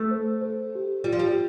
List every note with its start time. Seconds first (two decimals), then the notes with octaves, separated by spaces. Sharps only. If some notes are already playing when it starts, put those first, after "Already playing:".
Already playing: A3
0.11 C5
0.16 A4
0.41 C5
0.45 A4
0.75 G4
1.04 G3 F4
1.12 F3
1.19 G3
1.30 G4